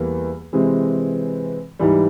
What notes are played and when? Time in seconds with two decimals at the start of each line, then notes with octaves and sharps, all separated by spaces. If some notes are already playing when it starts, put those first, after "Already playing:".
Already playing: E2 E3 G3 A#3
0.53 C3 E3 G#3 C4
1.79 G#2 E3 G3